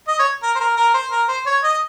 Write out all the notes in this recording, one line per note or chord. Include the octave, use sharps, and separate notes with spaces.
D#5
C#5
A#4
C5
A#4
A#4
C5
A#4
C5
C#5
D#5